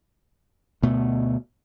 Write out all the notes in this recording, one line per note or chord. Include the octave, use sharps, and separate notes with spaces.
D2 B2 A3